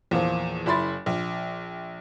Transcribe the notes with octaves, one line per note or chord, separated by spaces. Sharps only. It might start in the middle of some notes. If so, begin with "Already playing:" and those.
E2 A#2 F3
F#1 E4 B5 C6 A6
A#1